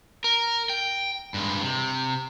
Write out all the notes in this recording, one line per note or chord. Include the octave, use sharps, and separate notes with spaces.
A#4
G5
G2 G#3
C3